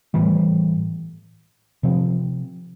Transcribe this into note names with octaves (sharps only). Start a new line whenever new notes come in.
A2 E3 G3
C3 F3 C4